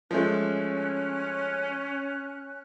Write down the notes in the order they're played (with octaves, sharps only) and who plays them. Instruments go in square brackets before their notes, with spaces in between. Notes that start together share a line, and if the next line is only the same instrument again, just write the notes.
[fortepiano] F3 G#3 A3 [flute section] C#4 F#6